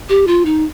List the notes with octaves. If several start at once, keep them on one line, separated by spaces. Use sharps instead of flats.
G4
F4
D#4